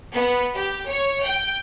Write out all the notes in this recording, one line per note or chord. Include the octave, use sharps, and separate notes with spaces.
B3
G4
C#5
G5